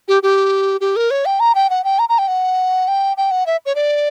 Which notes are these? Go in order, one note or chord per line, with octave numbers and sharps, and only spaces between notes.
G4
G4
G4
A#4
C#5
G5
A#5
G5
F#5
G5
A#5
A#5
G5
F#5
G5
G5
F#5
E5
C#5
D5